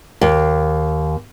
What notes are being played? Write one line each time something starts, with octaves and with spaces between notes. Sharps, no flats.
D#2